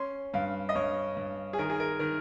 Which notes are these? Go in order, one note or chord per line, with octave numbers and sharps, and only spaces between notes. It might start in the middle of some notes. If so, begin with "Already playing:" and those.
Already playing: C#4 C6
G2 F5
D#5
G2 C#5
G2
G#4
D#3 A#4
G#4
A#4
D#3 A#4